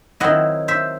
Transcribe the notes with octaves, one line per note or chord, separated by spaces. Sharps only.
D#3 F#3 C4 E4 D#5 F#5
C5 E5